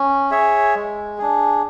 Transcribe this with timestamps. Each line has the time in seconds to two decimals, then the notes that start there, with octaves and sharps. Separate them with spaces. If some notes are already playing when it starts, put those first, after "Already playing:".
Already playing: C#4
0.31 G#4 C#5 E5
0.75 G#3
1.18 D4 G#4